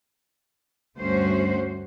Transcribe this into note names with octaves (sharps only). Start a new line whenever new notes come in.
D2 G2 A3 C#4 F#4 C5